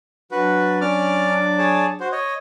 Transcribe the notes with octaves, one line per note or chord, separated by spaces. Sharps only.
F#3 D4 F#4 B4
C#4 D5 D6 F6
G#4 C#5 A5
F#4 C5
C#5 D#5